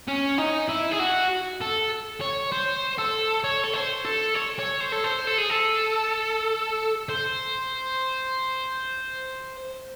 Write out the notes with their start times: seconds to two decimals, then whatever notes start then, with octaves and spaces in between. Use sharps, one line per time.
0.08 C#4
0.38 D#4
0.68 E4
0.91 G#4
0.99 F#4
1.61 A4
2.21 C#5
2.52 C5
2.98 A4
3.44 C#5
3.64 A4
3.74 C5
4.05 A4
4.34 C#5
4.59 C#5
4.80 C5
4.92 A4
5.04 C5
5.27 A4
5.38 G#4
5.50 A4
7.09 C5